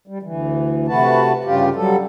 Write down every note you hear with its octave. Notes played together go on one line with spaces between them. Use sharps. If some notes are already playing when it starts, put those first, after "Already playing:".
G3
D2 E3
C3 A3 F#4 B4 A5
G2 C#3 F4 G4
F#3 G3 A4